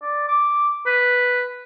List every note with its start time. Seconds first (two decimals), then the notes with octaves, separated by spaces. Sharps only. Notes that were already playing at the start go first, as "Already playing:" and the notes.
0.02 D5
0.28 D6
0.86 B4